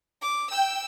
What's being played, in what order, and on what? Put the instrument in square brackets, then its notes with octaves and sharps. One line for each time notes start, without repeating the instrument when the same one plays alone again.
[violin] D6
[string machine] G5 [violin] E6